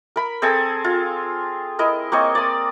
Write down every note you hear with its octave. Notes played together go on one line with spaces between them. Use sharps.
A#4 B5
C4 G#4 A4 G#5
F4
E4 A#4 D#5
A#3 C4 C#5 D#5
D5 D#6